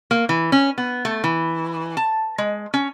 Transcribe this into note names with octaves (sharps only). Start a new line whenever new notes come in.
A#3
E3
C#4
B3
A3
E3
A5
G#3
C#4